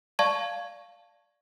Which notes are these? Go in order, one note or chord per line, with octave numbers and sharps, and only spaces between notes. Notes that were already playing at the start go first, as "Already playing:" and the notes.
D5 F5 A5 C#6 G#6